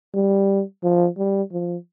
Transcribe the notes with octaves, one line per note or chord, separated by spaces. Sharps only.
G3
F3
G3
F3